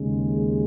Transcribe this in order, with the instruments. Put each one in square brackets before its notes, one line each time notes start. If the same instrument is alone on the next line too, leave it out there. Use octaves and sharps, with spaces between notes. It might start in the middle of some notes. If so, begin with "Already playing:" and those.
Already playing: [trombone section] D#2 C#3 G#3